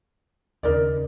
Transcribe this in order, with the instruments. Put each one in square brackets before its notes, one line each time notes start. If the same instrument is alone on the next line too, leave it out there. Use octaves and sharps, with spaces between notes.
[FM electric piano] D#2 C#3 [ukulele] D#4 A#4 D5